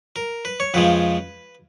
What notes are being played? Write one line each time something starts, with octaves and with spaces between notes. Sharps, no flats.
A#4
B4
C#5
F2 C#3 F3 G#3 B4